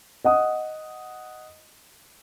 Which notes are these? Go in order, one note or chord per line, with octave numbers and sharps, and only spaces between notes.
D#5 F#5 D#6